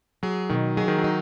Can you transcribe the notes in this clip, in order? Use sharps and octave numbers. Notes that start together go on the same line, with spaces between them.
F#3 G#4
B2 D#3
F#3 G#4
D#3
F#3
D#4